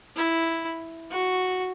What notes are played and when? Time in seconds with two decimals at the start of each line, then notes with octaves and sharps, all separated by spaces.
0.16 E4
1.11 F#4